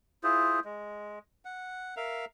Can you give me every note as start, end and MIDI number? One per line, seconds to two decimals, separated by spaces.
0.23 0.60 64
0.23 0.60 65
0.23 0.60 68
0.23 0.60 72
0.65 1.19 56
1.45 1.95 78
1.97 2.25 70
1.97 2.25 76
1.97 2.25 77